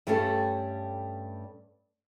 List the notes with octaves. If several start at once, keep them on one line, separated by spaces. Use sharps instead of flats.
G2 G3 A3 C#4 A4